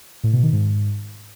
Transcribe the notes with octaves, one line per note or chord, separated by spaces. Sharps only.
A2
B2
D#3
G#2